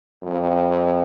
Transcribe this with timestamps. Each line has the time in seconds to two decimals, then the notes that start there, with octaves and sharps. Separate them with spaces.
0.23 F2